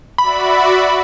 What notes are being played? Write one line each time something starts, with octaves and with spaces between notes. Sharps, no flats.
F#4 D5 E5 B5